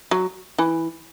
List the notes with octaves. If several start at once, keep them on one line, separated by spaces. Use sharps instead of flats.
F#3
E3